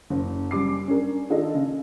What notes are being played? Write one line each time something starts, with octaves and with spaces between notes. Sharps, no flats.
F#1
F#2 G3 D6 C7
C#4 D4 A#4
D#3 D4 F4 A4 D#5
C#3